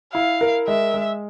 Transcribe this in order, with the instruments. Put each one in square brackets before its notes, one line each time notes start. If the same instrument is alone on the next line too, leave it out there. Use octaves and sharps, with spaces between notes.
[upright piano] E4 [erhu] F5
[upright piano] A#4
[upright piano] G#3 [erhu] E5
[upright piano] G#3